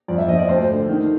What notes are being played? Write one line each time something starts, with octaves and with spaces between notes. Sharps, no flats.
F2 D5
E5
F3 D#5
D5
D2 C5
D3
D#3